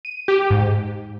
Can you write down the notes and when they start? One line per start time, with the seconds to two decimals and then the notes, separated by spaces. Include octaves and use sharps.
0.05 D#7
0.28 G4
0.50 G#2